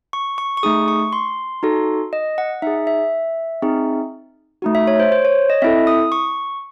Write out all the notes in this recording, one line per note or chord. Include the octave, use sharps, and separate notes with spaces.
C#6
C#6
C#6
A3 D#4 G#4 D#6
C#6
C6
D#4 F#4 A4
D#5
F#5
D#4 G#4 E5
E5
C4 D#4 G#4
A3 D#4 F#4
E5
C#5
C5
C5
C#5
D#5
C4 E4 A4 E5
D#6
C#6